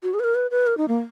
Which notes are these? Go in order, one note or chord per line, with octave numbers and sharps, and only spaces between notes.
F#4
G#4
B4
A#4
B4
B4
A#4
D#4
A#3